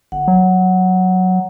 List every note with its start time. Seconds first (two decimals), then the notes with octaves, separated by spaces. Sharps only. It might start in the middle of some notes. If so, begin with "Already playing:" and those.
0.12 G1 F#5
0.28 F#3